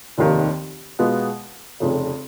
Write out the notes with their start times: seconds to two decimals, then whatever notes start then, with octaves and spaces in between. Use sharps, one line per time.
0.18 F1 D#2 D#3 A#3
0.99 B2 G#3 B3 F4
1.80 F1 F2 C#3